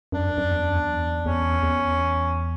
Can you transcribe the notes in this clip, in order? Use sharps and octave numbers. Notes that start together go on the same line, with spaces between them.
F#2 D4
F#2
E2
F#2
E2
E2 C#4
E2